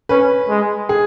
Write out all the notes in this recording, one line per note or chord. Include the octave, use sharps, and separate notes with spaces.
C#4 B4
G#3
G#4